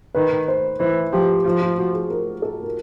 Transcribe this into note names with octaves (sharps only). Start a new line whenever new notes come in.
D#3 B4
C5
E3 C5
F3 G4
F3 F4
F4
F#4
G#4
A#4
A4
A#4